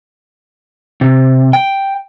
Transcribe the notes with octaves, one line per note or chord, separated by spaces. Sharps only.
C3
G5